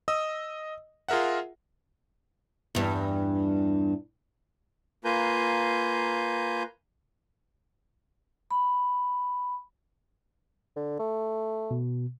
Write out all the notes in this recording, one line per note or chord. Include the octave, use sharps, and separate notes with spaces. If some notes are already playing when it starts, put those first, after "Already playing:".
D#5 D#6 E6
F4 G#4 A#4 E5 F#5
E2 G2
A#3 F4 B4 G#5 A#5 G6
B5
D3
A3
B2